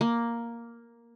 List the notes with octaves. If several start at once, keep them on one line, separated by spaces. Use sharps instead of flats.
A#3